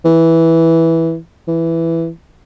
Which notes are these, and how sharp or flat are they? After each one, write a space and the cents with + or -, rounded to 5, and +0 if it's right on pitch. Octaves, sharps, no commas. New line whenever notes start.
E3 -5
E3 +5